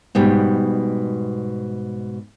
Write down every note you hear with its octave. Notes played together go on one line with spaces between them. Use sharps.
G#2 B2 G3 B3